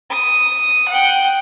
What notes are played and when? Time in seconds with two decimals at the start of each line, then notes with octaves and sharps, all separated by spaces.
0.10 D#6
0.89 F#5 G5